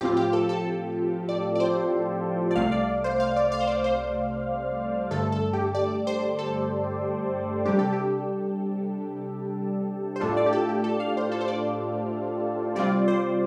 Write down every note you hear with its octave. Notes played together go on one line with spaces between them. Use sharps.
A2 F3 C4 F4 G4
G4
A4
A4
D5
D5
C5
D5
C2 C3 A3 F5
D5
C5
F5
D5
F5
C5
D5
C5
G2 D3 A3 A4
A4
G4
D5
C5
A4
C3 G3 D4 G4
A4
G4
C5
A2 A3 D4 F4 A4
D5
G4
A4
G4
A4
F5
C5
A4
C5
D5
C3 G3 C4 F4 D5
C5